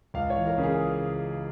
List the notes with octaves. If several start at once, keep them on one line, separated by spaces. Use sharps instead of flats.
C#2 F5
C#5
E3
A#4
C#3
G#4